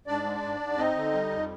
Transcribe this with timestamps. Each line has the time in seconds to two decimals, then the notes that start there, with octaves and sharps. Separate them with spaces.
0.07 G#2 D4 D5
0.24 G#3
0.43 G#2
0.61 G#2
0.77 C4 D#4 D#5
0.95 D3
1.13 G3
1.30 F2